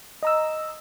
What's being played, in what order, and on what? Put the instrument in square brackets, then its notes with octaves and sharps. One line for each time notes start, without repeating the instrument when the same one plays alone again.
[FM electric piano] D#5 A#5 E6